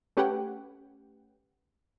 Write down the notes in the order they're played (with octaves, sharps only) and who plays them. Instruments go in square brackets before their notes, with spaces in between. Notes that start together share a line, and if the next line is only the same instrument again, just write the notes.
[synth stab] A3 C#4 G4 B4 F#5 G5